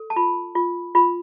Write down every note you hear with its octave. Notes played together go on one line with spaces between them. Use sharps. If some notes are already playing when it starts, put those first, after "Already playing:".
Already playing: A4
A5
F4 B5
F4
F4 B5